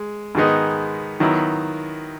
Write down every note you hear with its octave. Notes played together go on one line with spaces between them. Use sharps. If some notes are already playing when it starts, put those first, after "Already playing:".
Already playing: G#3
G#2 D#3 G#3 B3 D#4
D#3 F#3 B3 E4